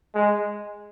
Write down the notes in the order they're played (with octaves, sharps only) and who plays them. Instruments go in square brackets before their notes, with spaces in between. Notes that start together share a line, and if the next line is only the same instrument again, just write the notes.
[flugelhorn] G#3